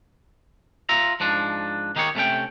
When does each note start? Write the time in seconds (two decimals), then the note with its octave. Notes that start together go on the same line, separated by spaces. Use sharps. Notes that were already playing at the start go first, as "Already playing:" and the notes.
0.89 F4 E5 A#5
1.20 G#2 F3 D4
1.96 D#3 D#4 G4 G#4 C#5
2.15 C3 A3 C#4 G5